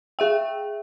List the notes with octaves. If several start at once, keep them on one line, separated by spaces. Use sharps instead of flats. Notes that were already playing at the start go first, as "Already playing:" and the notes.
G#4 E5 G5